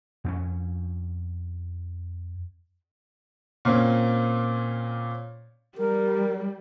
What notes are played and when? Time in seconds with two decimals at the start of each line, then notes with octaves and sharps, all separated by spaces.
0.24 F2 B3 C#4
3.65 A#2 A#3 C4 C#4
5.78 G3 A#4